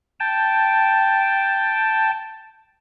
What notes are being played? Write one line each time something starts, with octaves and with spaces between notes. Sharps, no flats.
G5 A5